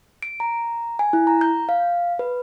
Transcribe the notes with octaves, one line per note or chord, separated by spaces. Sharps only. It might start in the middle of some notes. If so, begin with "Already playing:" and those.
D7
A#5
G#5
E4
A#5
G6
F5
B4